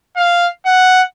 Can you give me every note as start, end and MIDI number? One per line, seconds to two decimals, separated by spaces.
0.16 0.48 77
0.66 1.02 78